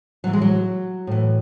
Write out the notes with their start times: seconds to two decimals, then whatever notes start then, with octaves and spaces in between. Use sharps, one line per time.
0.24 A2 E3 F#3
0.33 G#3
0.41 F#3
1.07 A2 E3